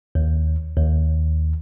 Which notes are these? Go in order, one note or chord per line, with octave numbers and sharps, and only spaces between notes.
D#2
D#2